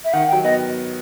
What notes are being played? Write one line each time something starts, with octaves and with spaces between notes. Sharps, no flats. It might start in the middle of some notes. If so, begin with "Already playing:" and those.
E5
D#3 F#5
F#3 G5
B3 D#5